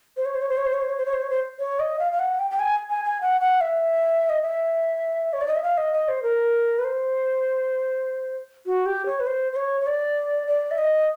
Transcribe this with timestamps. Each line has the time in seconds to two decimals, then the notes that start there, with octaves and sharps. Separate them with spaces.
0.17 C5
0.25 C#5
0.34 C5
0.42 C#5
0.49 C5
0.58 C#5
0.65 C5
0.73 C#5
0.81 C5
0.89 C#5
0.98 C5
1.06 C#5
1.13 C5
1.22 C#5
1.30 C5
1.59 C#5
1.80 D#5
1.99 F5
2.12 F5
2.19 F#5
2.39 G5
2.51 G5
2.59 G#5
2.90 G#5
3.05 G#5
3.21 F#5
3.41 F#5
3.61 E5
4.29 D#5
4.42 E5
5.33 C#5
5.41 D5
5.48 D#5
5.56 E5
5.63 F5
5.77 D#5
5.93 D#5
6.08 C5
6.23 A#4
6.79 B4
6.84 C5
8.66 F#4
8.86 G4
9.06 C#5
9.20 B4
9.27 C5
9.53 C5
9.56 C#5
9.81 C#5
9.87 D5
10.47 D5
10.71 E5
10.78 D#5